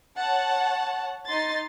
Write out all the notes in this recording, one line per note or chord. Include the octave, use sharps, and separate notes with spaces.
C#5 F#5 A5
D#4 C6 A6